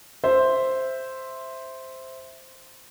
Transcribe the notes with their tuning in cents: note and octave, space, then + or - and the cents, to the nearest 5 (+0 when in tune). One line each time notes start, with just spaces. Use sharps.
C5 +0 E5 +0